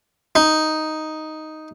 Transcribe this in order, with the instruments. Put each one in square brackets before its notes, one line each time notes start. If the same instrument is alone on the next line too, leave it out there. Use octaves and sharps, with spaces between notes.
[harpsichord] D#4